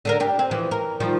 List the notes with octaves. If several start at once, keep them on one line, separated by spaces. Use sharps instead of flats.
D3 D4 A#4
D4 G4
C4
E3 F3
A#4
D#3 F3 G3